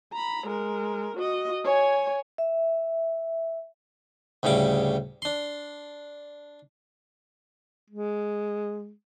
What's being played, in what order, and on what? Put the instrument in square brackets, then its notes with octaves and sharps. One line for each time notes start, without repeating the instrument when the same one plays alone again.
[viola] A#5 B5
G#3 A#4
F#4 D#5
C#5 G#5
[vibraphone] E5
[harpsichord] D2 A2 C#3 G3 D6
D4 C6
[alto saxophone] G#3